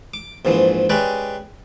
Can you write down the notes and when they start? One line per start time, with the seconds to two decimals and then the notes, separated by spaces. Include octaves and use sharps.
0.14 D6
0.45 A#1 G#2 E3 F3
0.89 G#3 C#4 G4 B4 D5